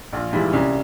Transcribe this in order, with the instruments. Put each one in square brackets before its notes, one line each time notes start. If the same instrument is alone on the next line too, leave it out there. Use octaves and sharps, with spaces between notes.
[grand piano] A#1 [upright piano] F4
[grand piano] G#2 E3 G3 [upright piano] E4
[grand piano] C2 [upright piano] C#4